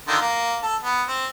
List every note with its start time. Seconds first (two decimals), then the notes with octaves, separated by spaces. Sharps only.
0.08 D3 D#3 F4
0.21 A#3
0.63 A4
0.84 B3
1.08 C4